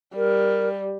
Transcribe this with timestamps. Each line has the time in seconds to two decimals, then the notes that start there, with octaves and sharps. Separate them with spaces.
0.16 G3 A#4